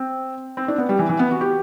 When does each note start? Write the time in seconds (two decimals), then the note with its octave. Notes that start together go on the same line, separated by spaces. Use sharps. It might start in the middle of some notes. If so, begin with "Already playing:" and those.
Already playing: C4
0.57 C4
0.68 D4
0.78 B3
0.89 G3
0.99 E3
1.09 E3
1.19 B3
1.31 F#4
1.41 G4